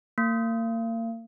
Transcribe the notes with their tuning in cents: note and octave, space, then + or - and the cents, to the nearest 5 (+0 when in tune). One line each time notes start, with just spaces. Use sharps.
A#3 -35